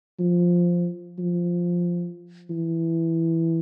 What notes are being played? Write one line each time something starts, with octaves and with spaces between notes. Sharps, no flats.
F3
F3
E3